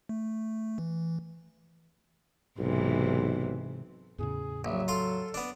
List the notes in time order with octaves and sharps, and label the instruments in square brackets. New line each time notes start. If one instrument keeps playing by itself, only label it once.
[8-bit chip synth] A3
E3
[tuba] B1 [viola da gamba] G#2 C3 E3
[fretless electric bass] E2 A2 C#3 [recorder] G#4
[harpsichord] A#1 [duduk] F#3 [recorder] E5
[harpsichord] F4 F5 C6 [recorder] A4
[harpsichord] B3 D4